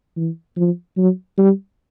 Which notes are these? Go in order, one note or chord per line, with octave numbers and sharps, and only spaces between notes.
E3
F3
F#3
G3